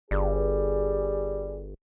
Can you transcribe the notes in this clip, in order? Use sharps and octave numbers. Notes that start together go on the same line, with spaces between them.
G1 G3 G#4